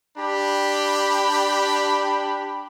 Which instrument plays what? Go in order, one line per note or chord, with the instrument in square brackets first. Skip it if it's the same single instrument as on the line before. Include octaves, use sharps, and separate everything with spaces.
[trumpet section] D4 G4 B5